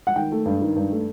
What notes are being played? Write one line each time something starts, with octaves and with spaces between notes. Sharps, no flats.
F#5
D#3 G5
A3
G2
D#3
G2
A3